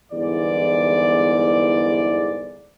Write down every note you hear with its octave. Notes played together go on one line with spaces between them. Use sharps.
G1 E2 G#2 E3 D5